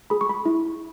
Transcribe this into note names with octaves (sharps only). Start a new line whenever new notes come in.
G#4 B5
C#6
B5
E4